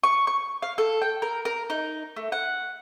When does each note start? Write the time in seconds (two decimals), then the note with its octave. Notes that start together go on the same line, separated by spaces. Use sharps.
0.04 C#6
0.27 C#6
0.63 F5
0.78 A4
1.02 G5
1.22 A#4
1.45 A#4
1.70 D#4
2.16 A3
2.32 F#5